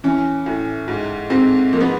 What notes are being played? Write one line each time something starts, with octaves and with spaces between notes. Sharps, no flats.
E3 C#4
A2
G#2
G#2 C4
F3 A#3
B3